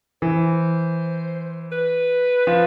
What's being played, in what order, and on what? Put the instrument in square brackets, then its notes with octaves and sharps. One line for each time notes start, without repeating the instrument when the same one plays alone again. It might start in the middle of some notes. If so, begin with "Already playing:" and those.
[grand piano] E3 [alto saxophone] C5
[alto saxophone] B4
[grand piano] F3